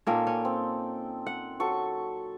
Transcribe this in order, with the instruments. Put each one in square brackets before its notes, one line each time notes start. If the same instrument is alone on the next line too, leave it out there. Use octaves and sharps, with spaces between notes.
[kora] A#2 A#3 C#4 [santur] D#4 A4 G5
[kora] C#4
[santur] C4
[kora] F#5
[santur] F#3 A4 C#6